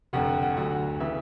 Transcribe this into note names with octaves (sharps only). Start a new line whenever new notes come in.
F1 F2 D3 F#5
F#5
D2 D3 F#3 F#5
C#3 E3 E5